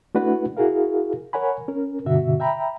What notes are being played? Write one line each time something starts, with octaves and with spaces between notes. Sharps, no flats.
A3 D4 E4 F#4 B4 F#5
E4 F#4 G#4 A#4 F5
A#4 C#5 F#5 G#5 B5
C#4 A#4
G2 B2 D3 F#4 E5
E5 G5 A#5 B5